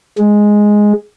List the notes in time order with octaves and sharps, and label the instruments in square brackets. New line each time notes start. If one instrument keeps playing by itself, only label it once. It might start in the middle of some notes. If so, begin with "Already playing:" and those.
[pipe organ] G#3